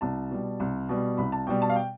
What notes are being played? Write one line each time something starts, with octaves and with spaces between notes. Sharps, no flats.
C2 A5
B2 G3
C2
B2 G3
C2 B5
A5
B2 G3 G5
A5
F5
G5